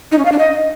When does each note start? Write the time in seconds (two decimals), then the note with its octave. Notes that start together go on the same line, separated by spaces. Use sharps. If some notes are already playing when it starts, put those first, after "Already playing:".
0.12 D#4
0.18 C#4
0.25 F5
0.32 D4
0.39 D#5